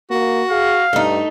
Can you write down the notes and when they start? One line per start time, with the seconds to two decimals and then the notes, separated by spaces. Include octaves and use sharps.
0.10 A#3 F#4
0.51 G#4 F5
0.93 G2 A3 D#4